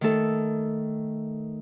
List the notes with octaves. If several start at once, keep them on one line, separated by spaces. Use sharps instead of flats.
D#3 A3 A4